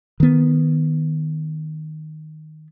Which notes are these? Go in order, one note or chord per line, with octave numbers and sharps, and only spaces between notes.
D#3 B3